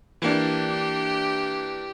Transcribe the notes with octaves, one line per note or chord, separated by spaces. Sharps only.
E3 A#3 D4 G4